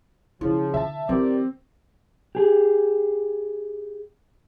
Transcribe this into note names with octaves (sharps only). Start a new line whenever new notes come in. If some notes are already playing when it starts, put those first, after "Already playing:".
C#3 F3 E4
D3 E5 A5
E3 C4 G4 A#4 D5
G4 G#4